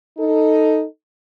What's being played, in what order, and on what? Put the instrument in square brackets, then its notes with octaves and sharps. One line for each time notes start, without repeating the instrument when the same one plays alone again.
[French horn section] D#4 A4